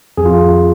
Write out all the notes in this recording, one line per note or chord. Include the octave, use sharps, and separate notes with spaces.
F2 G#4
F4